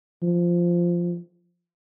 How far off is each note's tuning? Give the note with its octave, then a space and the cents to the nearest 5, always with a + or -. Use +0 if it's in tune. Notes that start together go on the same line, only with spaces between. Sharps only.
F3 -5